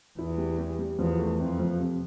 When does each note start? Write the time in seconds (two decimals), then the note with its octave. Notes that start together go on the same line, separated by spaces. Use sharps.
0.18 E2 E4
0.38 G3
0.58 G3
0.79 G3
0.99 E2 F3
1.19 A3
1.39 F2 C4
1.59 F3
1.80 C3